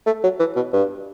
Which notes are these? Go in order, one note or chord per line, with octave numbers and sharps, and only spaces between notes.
A3
F#3
E3
B2
G2